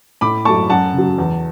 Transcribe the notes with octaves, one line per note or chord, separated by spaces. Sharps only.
A2 B5 D6
F#3 A3 A5 C#6
F#2 F#5 A5
C#3 F#3
E2